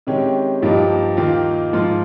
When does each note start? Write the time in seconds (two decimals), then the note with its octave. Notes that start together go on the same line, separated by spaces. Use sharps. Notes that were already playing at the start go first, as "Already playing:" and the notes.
0.07 C3 D#3 G#3 C#4 G4
0.62 G2 F3 A#3 D#4 G4
1.17 D#2 D#3 A#3 F4
1.73 G#2 F3 A#3 F4